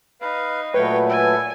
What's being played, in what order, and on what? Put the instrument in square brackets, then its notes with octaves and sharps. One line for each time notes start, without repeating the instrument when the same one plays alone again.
[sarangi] D#4 [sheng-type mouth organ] B4 F5
[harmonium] A#2 F#3 A3 [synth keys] B4 [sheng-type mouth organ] C#5 G5
[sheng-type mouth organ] A4 [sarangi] G#5